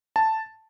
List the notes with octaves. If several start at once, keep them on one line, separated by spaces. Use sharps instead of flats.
A5